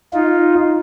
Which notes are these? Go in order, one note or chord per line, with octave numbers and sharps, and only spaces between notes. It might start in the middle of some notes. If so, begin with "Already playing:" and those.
D#4 F4